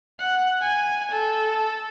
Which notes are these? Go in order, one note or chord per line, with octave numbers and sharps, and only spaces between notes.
F#5
G#5
A4